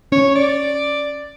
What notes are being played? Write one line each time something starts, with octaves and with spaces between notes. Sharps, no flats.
C#4 C#5
D5